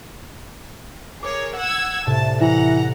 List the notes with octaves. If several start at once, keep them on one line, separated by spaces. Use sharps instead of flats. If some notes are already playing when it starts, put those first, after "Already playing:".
G#4 A#4 C#5 D6 C7
F#5 E6 G#6
C2 A2 C3 A5
E3 F#5 A#5